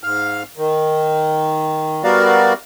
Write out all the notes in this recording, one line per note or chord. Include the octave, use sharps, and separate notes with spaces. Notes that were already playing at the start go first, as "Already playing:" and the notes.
G#2 F5 F6
D#3
G3 B3 F#4 A#4 D5 F5